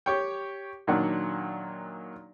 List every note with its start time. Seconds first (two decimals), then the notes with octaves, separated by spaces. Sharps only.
0.06 G4 C#5 G5
0.87 A#2 D#3 F#3 D4 F#5